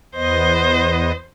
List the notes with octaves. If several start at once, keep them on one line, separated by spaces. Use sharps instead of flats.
E2 B3 C5 D#5